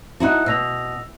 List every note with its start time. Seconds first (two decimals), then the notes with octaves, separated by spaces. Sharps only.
0.20 D#4 E4 F#4 A5 F#6
0.46 B2 E6 A#6 F7